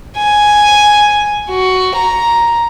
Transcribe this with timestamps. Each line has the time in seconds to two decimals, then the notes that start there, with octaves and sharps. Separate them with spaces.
0.17 G#5
1.50 F#4
1.96 A#5